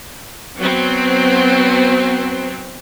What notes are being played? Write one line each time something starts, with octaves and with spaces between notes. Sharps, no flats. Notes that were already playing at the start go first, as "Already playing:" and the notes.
F#3 B3 C4